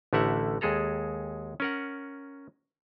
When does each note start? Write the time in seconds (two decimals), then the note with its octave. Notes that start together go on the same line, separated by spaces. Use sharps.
0.13 A1 D3 A3 A#4 E5 F#5
0.61 D#2 G#3 G#4 A4 A#5
1.60 C#4 A#4 F#5